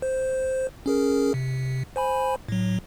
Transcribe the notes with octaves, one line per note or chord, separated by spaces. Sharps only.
C5
C#4 G#4 A#4
C3
C5 G#5 B5
A2 F#3